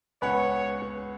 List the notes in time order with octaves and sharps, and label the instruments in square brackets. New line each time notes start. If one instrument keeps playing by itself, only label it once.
[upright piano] C#2 B3 F#5 [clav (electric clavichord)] B4 [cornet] C#5